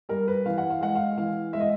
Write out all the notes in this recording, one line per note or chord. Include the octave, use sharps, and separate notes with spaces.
G3 A#4
B4
E3 F5
F#5
F5
G#3 F#5
F5
E3 F5
G#3 E5
D#5